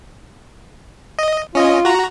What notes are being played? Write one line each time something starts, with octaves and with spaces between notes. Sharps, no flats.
D#5
C#4 F4 D#5
F#4 A#5